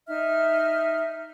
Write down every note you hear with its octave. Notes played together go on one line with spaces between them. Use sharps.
D#4 E5 F6